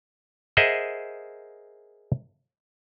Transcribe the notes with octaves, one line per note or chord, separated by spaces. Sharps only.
G#4 A#4 C5 D#5 E5 F#5